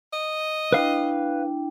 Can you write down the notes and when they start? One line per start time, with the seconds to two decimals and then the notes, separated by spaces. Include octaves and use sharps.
0.13 D#5
0.72 D4 E4 B4 F5 G5